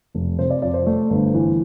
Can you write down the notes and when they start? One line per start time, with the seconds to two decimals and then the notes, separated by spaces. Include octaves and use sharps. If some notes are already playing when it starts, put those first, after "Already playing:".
0.15 F1
0.39 C3 C5
0.50 D5
0.62 F2 D5
0.74 C5
0.86 A3
1.10 G1
1.34 E3